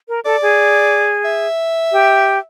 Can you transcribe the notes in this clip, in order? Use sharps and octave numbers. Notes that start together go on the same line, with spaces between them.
A#4
A4 D5
G#4
E5
G4